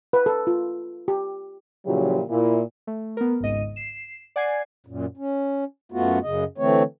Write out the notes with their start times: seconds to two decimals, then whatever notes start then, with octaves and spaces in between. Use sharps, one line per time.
0.13 B4
0.26 A4
0.47 F4
1.08 G4
1.86 A#2 C#3 F3 F#3 E4 G4
2.30 A#2 E4
2.87 A3
3.17 B3 A#4
3.40 G#1 C#2 G#2 D#5 D#7
3.76 C7 E7
4.36 D5 F#5 G#5 G#6 C7
4.87 F#2 A#2
5.17 C#4
5.92 F#2 A3 B3 F4 F#4
6.23 F#2 C#3 D#5
6.58 D3 E3 A3 C4 C#5